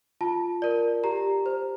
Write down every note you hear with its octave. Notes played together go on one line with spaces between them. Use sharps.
F4 A5
A#4 D5
G4 A#5
C5